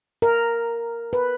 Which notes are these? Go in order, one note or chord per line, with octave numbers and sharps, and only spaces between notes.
A#4
B4